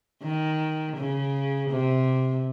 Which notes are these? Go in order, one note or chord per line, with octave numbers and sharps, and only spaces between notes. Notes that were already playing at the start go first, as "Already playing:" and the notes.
D#3
C#3
C3